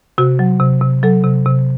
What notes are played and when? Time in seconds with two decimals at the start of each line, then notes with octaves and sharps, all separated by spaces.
0.18 C3 F#4
0.39 F#3
0.60 C3
0.81 C3
1.03 F#3 A4
1.24 C3
1.45 C3